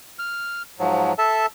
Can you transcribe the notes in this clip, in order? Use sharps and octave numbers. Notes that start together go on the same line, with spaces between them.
F6
G#2 F3 F#3
A4 E5 A5